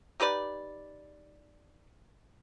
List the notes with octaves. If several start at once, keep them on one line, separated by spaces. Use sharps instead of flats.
D#4 G4 B4 D5